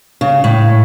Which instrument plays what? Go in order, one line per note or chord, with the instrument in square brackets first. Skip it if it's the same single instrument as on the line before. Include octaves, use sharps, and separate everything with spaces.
[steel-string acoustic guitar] C#3
A2